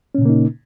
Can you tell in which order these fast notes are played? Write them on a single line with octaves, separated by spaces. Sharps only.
C#4 A#2 C#3 A#3 D#4